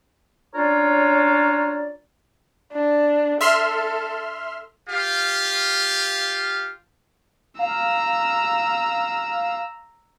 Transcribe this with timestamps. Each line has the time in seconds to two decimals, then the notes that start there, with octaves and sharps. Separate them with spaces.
0.55 C#4 D4 F4 A#4 C#5 D5
2.73 D4
3.41 A4 E5 C6 F6
4.88 F4 G4 F5
7.59 F5 A#5 E6